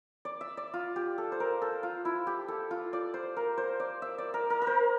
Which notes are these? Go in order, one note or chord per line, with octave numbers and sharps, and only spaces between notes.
D5
E5
D5
F4
G4
A4
C5
A#4
A4
F4
E4
G4
A4
F4
D5
C5
A#4
C5
D5
E5
D5
A#4
A#4
A#4
C5